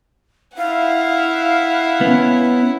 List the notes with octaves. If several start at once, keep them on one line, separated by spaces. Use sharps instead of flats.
E4 F5 F#5
B3 C#4